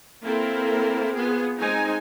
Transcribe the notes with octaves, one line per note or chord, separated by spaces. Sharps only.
A#3 C4 E4 A4 A#4
B3 F4 G#4
G#3 C4 D#4 G#5